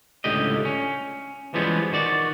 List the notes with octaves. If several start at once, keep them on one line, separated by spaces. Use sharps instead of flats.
C#2 A2 D3 G4 D#5
C#4
E3 F3 G3 G#3 B3 C#4
D#3 F#4 D5